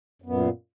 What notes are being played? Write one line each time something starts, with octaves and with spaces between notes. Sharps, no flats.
F#2 A#2 B3